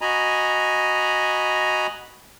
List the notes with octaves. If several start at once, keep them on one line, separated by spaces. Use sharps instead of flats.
F#4 D#5 G#5 A#5 B5